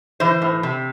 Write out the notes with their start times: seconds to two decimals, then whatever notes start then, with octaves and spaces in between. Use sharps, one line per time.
0.20 E3 C5
0.42 A2
0.63 C3